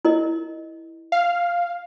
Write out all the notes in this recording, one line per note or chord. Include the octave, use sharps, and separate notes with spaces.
E4 A#4 D#5
F5